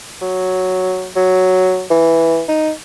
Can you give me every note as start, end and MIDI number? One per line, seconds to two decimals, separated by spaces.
0.22 1.09 54
1.16 1.84 54
1.90 2.43 52
2.48 2.72 63